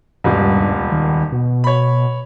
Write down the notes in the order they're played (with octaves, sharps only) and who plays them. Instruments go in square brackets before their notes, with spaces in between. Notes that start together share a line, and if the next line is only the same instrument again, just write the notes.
[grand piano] D#1 C#2 B2 [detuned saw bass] G2
[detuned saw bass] D#3
B2
[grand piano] C#5 B5